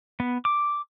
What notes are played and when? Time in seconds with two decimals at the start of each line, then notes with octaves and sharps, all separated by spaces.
0.20 B3
0.45 D6